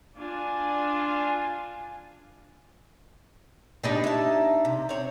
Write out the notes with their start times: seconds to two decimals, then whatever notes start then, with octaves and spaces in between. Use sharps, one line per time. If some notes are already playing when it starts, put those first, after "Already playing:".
0.18 D4 F4 G#5
3.83 B3 D4 D#4 G4 D5 G5
4.04 E4 A5
4.65 C3
4.89 C4 C#5